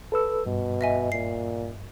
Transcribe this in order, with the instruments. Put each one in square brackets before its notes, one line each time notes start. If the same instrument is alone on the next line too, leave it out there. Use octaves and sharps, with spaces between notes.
[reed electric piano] A4 B4 E6
[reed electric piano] G2 [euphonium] B2
[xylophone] D#5 E5 G#5
[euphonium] A#2 [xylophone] C7